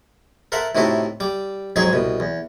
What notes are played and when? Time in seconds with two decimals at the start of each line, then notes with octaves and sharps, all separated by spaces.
0.52 A4 A#4 C5 E5 F#5
0.75 A2 C3 D#4 E4 F#4 A4
1.20 G3 D6
1.76 F2 G#2 F#3 D#4 G#4 G#5
1.93 C2 B2
2.20 E2